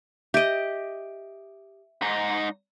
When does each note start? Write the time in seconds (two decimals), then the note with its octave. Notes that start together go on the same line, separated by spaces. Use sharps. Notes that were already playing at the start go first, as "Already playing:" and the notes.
0.34 G4 D#5 E5 D7
2.02 G#2 D#4